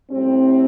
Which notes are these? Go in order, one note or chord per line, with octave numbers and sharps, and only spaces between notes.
A2 G3 C4